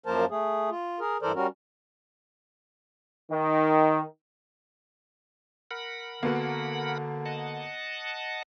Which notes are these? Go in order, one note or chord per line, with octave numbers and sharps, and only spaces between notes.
F#2 F3 A#3 A#4 C5 A5
A3 G#4
F4
G#4 A#4
G2 E3 A4 A#4 C5 D5
G3 C#4 F#4 A#4
D#3
A#4 F#5 B5
D3 A#3 B3 F#4
D#5 F#5 A5